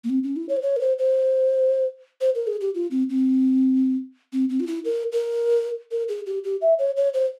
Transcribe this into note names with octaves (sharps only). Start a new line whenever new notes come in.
A#3
C4
C#4
E4
C#5
C5
C#5
A#4
C5
C5
C5
A#4
G#4
G4
F4
C4
C4
C4
C4
F4
E4
A#4
A#4
A#4
G#4
G4
G4
E5
C#5
C#5
C5